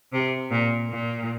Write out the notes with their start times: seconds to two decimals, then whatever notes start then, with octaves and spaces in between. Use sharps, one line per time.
0.13 C3
0.52 A#2
0.91 A#2